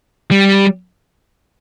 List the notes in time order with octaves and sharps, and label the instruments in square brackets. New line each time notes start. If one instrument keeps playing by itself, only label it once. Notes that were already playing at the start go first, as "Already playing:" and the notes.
[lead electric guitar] G3